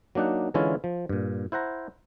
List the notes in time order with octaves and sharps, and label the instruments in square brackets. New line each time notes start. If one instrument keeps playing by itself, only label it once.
[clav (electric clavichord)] F#3 A#3 D4 D#4 F#5
D3 E3 G#3 C#4 E4 F4
F3
G2 A#2
E4 C5 F#5 A#5